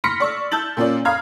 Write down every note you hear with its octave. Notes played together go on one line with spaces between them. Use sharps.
B5 C6 F6 A#6 B6 C#7
D5 C#6 E6
A5 E6 G6 A6 F#7
A#2 C#4 F4 D5
F5 A#5 B5 D#6 F6 G#6